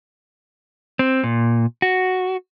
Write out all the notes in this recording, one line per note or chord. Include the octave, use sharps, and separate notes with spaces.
C4
A#2
F#4